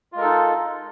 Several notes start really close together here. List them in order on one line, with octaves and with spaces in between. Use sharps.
F4 G#3 A#4 A4 D#4